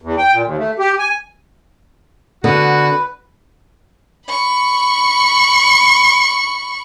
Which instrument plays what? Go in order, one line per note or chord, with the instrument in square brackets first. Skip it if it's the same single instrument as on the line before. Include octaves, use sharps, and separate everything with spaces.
[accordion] E2
G5
A#2
D#2
A3
G4
G#5
[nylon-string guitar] D3 B3 [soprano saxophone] F#4 [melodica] B4
[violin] B5 C#6